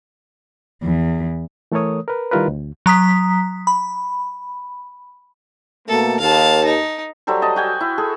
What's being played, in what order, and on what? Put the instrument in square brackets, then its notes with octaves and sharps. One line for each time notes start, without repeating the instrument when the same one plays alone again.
[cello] E2
[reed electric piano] E3 A3 A4 A#4 C#5 D#6
A#4 B4
D#3 G3 E4 F4 A#4 B4
D2
[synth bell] F#3 A#5 D#6 B6
B5
[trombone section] B2 A3 A#3 [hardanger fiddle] A4
[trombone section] D#2 [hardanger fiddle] F5 A5
[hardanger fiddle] D#4
[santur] F#3 G3 A4 C5
D#5 A5
F#4 G5 G#5
E4
G#4 A4